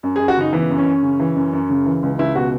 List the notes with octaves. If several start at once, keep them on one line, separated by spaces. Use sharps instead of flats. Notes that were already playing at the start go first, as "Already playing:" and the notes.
F#2
G#4
F#2
F#4
C#3 D#4
E3 B3
F#2
C#4
F#2
C#3
E3
F#2
F#2
C#3
E3
C#2
C#2 E4
B2 F#4